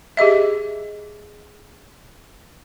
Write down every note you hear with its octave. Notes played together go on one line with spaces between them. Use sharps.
G4 G#4 D#5 E5